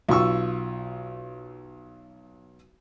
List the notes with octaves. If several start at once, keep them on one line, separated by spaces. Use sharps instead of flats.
B1 F4 C#6 E6